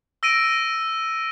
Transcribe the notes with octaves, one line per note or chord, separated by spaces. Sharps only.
E6 A#6 D7 D#7